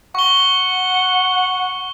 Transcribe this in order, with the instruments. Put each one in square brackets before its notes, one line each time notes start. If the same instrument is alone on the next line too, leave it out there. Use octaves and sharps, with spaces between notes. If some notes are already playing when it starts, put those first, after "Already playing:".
[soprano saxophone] F#5 [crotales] C#6 G7